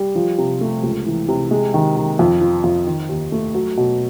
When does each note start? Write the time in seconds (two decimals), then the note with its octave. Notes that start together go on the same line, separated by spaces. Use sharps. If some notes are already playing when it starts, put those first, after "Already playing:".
Already playing: G3
0.15 F3
0.38 C3
0.61 A3
0.83 C#2
1.06 E3
1.28 C3
1.51 G#3
1.74 D#3
1.97 D#3
2.19 F2
2.41 F3
2.64 F2
2.87 D#3
3.09 D#2
3.32 A3
3.54 F#3
3.77 B2